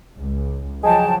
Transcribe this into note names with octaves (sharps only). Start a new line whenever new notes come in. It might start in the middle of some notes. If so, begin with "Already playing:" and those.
C#2
F3 F#3 G#4 D#5 G5 A5